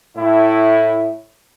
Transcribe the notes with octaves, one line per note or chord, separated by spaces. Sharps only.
A2 E4